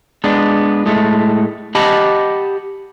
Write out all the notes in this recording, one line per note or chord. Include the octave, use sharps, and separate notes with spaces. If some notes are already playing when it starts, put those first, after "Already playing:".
G#3 B3 D4
A2 G#3 A3
G4 D#5 F#5 A5 B5